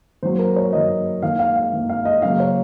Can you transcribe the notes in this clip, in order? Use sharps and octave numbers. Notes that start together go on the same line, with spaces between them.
D#3 F#3 A#3 C5
A#4
C#5
D#3 F#3 A#3 D#5
D#3 A#3 F5
F5
F5
D#3 A#3
F5
D#5
C#3 F#3 A#3 F5
C#5